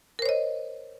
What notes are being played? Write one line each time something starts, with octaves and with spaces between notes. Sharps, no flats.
A#4 C5 C#5 D#5